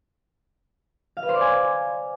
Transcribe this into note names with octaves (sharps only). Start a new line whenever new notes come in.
F5
B4
C5
D5
G#5